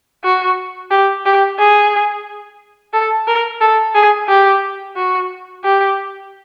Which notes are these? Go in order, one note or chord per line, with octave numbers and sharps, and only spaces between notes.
F#4
G4
G4
G#4
A4
A#4
A4
G#4
G4
F#4
G4